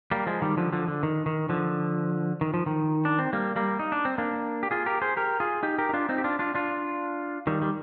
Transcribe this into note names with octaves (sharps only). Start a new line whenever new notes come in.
G3 A#3
F3 G#3
D#3 G3
D3 F3
D3 F3
D3
D#3
D#3
D3 F3
D#3
F3
D#3
D4
C4
G3 A#3
G3 A#3
D#4
D4
C4
A#3 D4
G4
F4 G#4
G4 A#4
G#4 C5
G4 A#4
F4 G#4
D#4 G4
G4 A#4
D#4
D4 F4
C4 D#4
G4
D4 F4
D4 F4
D4 F4
D#3 G3
G3